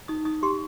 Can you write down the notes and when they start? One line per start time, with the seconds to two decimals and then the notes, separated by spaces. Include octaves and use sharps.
0.08 D#4 D#6
0.25 D#4 D#6
0.43 G4 C6